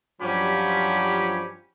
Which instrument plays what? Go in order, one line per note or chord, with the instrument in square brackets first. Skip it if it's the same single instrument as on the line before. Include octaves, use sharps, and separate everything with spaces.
[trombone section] G2 F3 [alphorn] F#3 [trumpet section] C#4 G4 B5